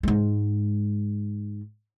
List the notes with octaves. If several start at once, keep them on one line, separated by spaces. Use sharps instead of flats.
G#2 G#3